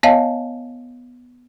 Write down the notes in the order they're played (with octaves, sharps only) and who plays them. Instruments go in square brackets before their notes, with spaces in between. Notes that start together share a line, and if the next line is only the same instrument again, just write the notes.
[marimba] B3 C#5 D#5 F5 A5